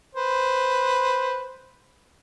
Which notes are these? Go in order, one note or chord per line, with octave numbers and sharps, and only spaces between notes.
B4 C5